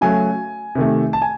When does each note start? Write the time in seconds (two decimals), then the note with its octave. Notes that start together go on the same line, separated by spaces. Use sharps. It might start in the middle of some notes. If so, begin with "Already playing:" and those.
0.01 C#3 F#3 A3 G#5
0.75 C3 D#3 A3
1.13 A5
1.22 G#5